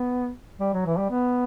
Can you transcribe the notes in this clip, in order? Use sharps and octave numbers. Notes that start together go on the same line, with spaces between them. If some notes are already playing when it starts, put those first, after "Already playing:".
Already playing: B3
G3
F#3
E3
G3
B3